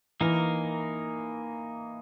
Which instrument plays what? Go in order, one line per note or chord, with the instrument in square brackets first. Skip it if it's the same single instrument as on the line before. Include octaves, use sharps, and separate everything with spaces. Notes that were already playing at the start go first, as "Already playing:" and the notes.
[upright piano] E3 [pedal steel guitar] A#3 D#4 A#4